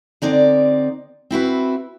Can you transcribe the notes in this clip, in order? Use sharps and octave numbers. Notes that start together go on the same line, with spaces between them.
D3 C4 D#4 D5
C4 E4 F#4 B4